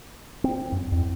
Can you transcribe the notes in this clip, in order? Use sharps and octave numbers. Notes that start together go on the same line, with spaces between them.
C4
F#2
E2